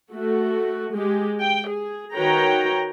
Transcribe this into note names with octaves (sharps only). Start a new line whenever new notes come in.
A3 F#4
G#3 G4
G5
G#4
D#3 F#4 B4 C#5 G5 A#5